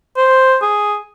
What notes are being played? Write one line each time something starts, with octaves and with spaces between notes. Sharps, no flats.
C5
G#4